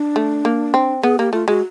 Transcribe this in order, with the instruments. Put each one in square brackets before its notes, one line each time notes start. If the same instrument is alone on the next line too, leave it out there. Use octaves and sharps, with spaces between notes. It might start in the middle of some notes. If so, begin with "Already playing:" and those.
Already playing: [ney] D4
[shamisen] A3
A#3
C4
[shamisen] B3 [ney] G#4
[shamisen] A#3 [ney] G4
[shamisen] A3 [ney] F4
[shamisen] G#3 [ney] F#4